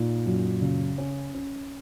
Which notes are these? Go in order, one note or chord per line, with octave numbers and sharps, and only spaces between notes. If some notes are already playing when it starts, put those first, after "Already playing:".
Already playing: A#2 D#4
F#2
C#3
C#4
C#4